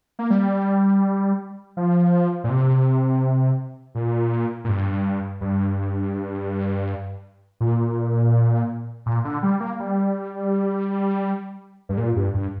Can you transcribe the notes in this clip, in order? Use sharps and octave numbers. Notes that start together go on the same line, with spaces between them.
A#3
G3
F3
A#2
C3
A#2
A#2
G2
G2
A#2
A#2
D3
G3
A#3
G3
G2
A#2
G2
G2